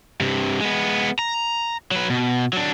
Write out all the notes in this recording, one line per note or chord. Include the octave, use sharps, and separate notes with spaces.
G2 C3
G#3 B3
A#5
F#3 B4
B2
F#3 D4